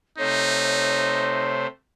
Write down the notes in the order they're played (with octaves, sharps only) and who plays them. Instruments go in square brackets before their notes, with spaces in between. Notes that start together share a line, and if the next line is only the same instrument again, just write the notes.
[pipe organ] C3 A3 C5 [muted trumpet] D#4 [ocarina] C#5